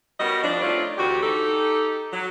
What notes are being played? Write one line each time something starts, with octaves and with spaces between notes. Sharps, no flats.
G3 B3 C#4 F#4 A#4 D#5
F3 G3 C4 D4
A3 C4 D#4 F4 C#5 D5
D2 E3 C4 F#4 G4
D#4 G4 A4
F#3